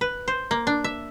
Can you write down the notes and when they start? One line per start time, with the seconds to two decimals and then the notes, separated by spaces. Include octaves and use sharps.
0.01 B4
0.28 C5
0.51 A#3
0.67 D4
0.84 E5